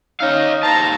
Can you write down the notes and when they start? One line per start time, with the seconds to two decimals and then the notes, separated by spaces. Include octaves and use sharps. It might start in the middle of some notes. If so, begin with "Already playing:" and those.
0.21 C#4 D#4 D#5 F5
0.63 D#2 C5 A5 A#5